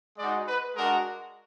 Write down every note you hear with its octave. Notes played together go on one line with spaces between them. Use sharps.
G#3 D#4 F#4 D5
B4
G#3 D4 F#4 A#4